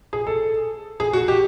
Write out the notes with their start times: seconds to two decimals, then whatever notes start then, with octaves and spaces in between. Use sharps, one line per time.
0.13 G#4
0.27 A4
1.00 G#4
1.13 F#4
1.28 G4